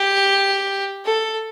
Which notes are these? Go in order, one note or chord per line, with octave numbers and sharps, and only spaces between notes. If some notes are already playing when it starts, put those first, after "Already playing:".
Already playing: G4
A4